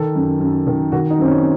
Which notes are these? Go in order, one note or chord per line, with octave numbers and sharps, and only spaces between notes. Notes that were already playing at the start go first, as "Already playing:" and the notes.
Already playing: D#3 A4
F#2
F#2
D#3
D#3 F#4
D#4
F#2 C4
C#4